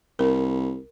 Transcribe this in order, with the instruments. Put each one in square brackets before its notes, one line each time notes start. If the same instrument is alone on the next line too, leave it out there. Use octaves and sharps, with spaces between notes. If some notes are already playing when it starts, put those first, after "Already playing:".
[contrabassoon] C2 [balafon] A#4